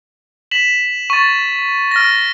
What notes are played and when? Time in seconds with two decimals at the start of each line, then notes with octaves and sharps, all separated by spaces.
0.51 B6 E7 F#7
1.10 C#6 A6
1.91 F6 A#6